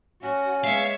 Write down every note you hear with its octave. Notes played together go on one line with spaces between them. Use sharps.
C#4 F#4
G#3 B3 C#5 E5 F5